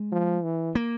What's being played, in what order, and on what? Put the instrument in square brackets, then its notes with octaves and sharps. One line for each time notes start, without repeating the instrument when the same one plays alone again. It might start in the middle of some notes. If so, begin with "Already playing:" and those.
Already playing: [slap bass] G#3
[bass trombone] F3
E3
[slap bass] A#3